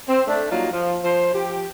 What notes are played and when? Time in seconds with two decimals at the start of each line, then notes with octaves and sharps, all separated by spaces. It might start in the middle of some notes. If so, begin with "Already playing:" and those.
0.07 C4
0.27 A3 D4
0.50 F#3 G3 A#3 D#4 F4
0.71 F3
1.02 F3 C5
1.32 F3 G4